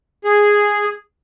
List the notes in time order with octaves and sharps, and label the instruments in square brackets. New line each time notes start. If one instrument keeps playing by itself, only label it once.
[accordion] G#4